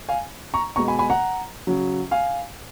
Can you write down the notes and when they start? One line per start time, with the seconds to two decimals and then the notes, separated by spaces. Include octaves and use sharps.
0.09 F5 G#5
0.54 A#5 C#6
0.76 B2 G#3 A#5 C#6
0.88 G#5 B5
0.99 G#5 B5
1.10 F#5 A#5
1.67 C#3 F#3
2.11 F5 G#5